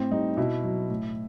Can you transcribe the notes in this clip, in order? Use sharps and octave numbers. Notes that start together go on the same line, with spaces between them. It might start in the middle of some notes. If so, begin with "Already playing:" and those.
Already playing: A2 C4
G3 D#4
B2 E4
F#3
A2